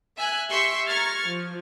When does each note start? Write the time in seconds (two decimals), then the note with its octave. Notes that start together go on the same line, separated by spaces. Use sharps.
0.17 E5 G#5 F#6
0.49 G4 E5 C6 C#6 E6
0.88 A#5 C#6 F6 G#6 A6
1.25 F3